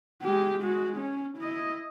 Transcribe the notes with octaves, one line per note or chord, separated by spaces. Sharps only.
G#3 G4
G#3 F#4
C#4
E4 D#5